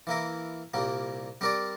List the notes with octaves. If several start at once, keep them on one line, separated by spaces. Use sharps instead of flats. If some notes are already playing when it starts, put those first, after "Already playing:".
E3 A#3 E4 A#4
C2 A#2 G3 A#3
G3 C4 G4 A#4 D5